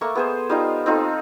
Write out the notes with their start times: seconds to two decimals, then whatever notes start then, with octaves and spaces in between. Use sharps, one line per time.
0.01 A3 A#3 C#6
0.15 B3 G#4 C5
0.50 G3 D#4 F4
0.86 C4 D#4 F4 A4